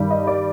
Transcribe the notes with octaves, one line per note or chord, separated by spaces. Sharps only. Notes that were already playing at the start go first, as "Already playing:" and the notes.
Already playing: G2 D#3 G3
D#5
D5